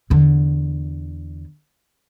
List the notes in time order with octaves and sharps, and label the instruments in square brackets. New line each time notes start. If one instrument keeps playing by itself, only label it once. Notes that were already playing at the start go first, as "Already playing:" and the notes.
[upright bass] E2 D3